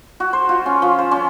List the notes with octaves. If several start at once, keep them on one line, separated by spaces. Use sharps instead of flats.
F#4
C5
F4
C#4
F3
C5
C#4